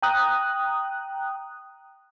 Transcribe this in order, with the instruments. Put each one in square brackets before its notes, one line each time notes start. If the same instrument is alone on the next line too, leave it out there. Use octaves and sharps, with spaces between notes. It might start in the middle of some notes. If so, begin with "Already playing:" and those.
[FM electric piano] G5 A#5 D#6 F#6